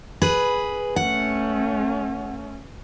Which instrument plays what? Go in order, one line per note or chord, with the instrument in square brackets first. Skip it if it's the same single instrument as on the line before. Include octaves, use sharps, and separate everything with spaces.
[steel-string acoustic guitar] G#4 B4
[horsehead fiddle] A3 C#4 [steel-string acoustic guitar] F#5